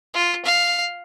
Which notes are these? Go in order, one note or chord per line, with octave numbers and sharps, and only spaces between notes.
F4
F5